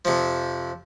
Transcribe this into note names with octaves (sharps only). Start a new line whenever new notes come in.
F2 C3 F3